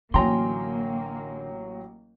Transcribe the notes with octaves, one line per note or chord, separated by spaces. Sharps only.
A1 D3 F#3 A#3 G5 G#5 A#5 C6